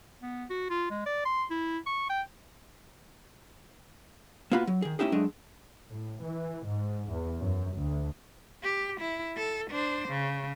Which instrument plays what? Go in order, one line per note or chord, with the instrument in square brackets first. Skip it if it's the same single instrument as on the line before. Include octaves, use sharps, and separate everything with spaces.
[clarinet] B3
F#4
F4
G#3
D5
C6
E4
C#6
G5
[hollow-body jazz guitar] A#3 B3 F4 F#4 B5
F#3
D#3 G#4
A3 C#4 D#4 E4 G4 G#4
F#3 G#3 A3 D4 D#5
[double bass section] A2
E3
G#2
E2
F#2
D2
[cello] G4
E4
A4
D4 C5
C#3